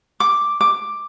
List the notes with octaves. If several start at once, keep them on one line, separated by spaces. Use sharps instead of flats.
D6
D6